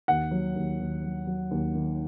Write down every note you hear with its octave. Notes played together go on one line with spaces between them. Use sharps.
D#2 F#5
F#3
D#2
D#2
F#3
F#3
D#2
D#3